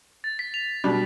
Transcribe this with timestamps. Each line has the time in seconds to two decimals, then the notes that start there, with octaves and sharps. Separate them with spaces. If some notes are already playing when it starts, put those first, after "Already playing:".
0.24 A6
0.39 B6
0.54 F7
0.84 B2 G3 D4